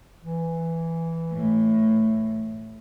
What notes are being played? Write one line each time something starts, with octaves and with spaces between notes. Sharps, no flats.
E3
A2